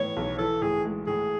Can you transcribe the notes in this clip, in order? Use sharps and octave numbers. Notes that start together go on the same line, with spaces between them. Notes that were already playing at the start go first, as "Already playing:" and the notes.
Already playing: A2 E3 B3 C#5
B1
E3 A4
A2 G#4
G#3
A2 G#4